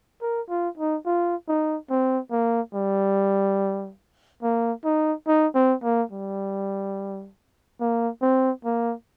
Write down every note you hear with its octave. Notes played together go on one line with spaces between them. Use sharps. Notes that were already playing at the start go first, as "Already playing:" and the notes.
A#4
F4
D#4
F4
D#4
C4
A#3
G3
A#3
D#4
D#4
C4
A#3
G3
A#3
C4
A#3